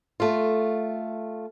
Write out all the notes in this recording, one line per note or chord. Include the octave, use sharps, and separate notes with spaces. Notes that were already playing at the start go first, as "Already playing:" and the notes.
A3 F4